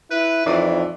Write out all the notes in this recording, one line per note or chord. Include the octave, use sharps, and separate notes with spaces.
E4 B4
F2 E3 D#4 C#5 D5